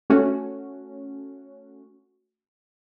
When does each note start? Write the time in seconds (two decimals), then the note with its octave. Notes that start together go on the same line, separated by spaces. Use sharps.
0.10 A3 C#4 F#4